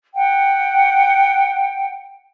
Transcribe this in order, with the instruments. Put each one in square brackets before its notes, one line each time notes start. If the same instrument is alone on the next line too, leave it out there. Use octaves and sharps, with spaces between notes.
[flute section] F#5 G5